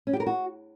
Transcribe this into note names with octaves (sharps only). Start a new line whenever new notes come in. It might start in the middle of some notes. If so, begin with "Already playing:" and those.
C#4
G4
A#4
F#4